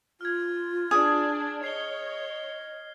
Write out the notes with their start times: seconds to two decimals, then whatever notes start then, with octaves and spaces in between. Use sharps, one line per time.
0.21 F4 F6 G#6
0.91 D4 G#4
1.64 C#5 D#5 C7 G7